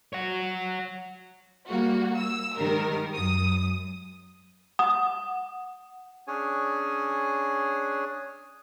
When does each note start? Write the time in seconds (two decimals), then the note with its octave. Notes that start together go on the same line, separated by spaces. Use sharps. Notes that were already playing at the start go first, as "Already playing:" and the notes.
0.13 C#5 F#5
1.69 G3 A#3 F#4
2.17 E6
2.58 G#2 D#3 G3 A#4
3.15 F#2 D#6
4.79 F#5 D#6
6.27 C#4 D4 G#4 C#5 G#5